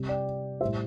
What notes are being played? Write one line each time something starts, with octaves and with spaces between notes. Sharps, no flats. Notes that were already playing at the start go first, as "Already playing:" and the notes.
Already playing: C3 G3
D5 G5
A2 G3 C5 E5